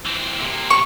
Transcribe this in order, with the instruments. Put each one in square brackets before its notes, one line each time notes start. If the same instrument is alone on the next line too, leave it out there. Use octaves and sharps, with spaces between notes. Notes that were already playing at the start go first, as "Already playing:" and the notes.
[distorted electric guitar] E3 C4
C3 A#3
[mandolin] C#6